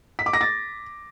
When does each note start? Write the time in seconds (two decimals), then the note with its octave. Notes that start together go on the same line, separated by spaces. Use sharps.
0.19 B6
0.26 D6
0.33 A#6
0.41 A6